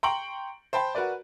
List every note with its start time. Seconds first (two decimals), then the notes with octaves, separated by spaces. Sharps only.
0.03 G5 A#5 C6 C#6 D7 F#7
0.73 C5 G5 A5 B5
0.95 F#4 A#4 B4 D5